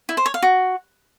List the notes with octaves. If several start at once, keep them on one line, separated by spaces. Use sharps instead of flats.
E4
C5
C#5
F5
F#4